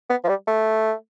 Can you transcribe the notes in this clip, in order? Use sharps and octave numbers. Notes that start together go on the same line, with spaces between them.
B3
F3
G3
A3